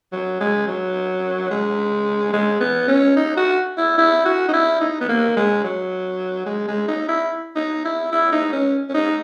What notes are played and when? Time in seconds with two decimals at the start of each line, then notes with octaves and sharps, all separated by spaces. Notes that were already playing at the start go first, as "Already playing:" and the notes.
0.13 F#3
0.41 G#3
0.68 F#3
1.51 G#3
2.33 G#3
2.61 B3
2.88 C#4
3.16 D#4
3.37 F#4
3.78 E4
3.98 E4
4.25 F#4
4.49 D#4
4.53 E4
4.81 D#4
5.01 B3
5.09 A#3
5.37 G#3
5.64 F#3
6.46 G#3
6.68 G#3
6.88 D#4
7.09 E4
7.56 D#4
7.85 E4
8.12 E4
8.32 D#4
8.53 C#4
8.89 C#4
8.94 D#4